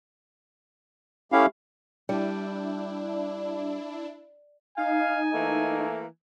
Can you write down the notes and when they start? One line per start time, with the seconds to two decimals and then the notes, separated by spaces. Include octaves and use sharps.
1.32 A3 C#4 E4 G4 F5
2.09 G3 D4 E4
4.78 D#4 F5 G#5
5.34 E3 A3 A#3